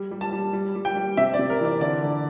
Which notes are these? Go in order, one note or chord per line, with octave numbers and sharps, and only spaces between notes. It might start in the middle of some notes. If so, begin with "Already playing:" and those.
Already playing: G3
G3
A5
G3
G3
G3
G5
G3
C3 E5
D5
C3
A#4
E3 D5
D3 D5
D3